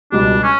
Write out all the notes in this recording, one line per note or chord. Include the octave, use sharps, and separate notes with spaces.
C#2 B2 G3 D4
C#4